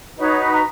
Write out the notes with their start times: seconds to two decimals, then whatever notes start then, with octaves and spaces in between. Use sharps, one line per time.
0.16 D#4 F#4 B4 C#5
0.50 A#5